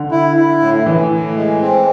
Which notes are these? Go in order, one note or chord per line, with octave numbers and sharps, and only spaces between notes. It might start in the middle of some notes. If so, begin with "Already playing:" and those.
Already playing: D3
E4
E4
A2
A2 E3
A2
G#3
C4